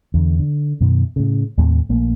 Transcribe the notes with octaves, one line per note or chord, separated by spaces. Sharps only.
E2 D3
D3
F#2 B2 D#3
A2 C#3
D#2 A2 A3 C4
A#1 A3 A#3